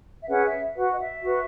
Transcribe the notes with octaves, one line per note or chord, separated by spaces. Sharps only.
E5
C#4 G#4 B4 F#5
E5
F#4 B4 F#5
D#5
E5
F#4 B4